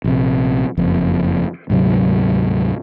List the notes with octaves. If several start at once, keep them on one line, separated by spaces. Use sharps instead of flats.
A#1 C3
F#1 F2
D2 G#2 C3 F#3